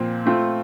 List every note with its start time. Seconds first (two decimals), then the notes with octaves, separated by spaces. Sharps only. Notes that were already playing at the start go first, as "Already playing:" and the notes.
Already playing: A#2 F3 C4
0.26 A3 C4 F4